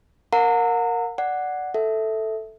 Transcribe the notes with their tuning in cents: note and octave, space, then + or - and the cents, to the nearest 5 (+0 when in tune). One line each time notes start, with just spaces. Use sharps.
A#4 +0 F#5 -40 A#5 -35
D5 +0 F#5 +0
A4 +0 E5 -10